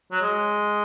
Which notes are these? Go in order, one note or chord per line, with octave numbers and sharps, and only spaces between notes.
F#3
G#3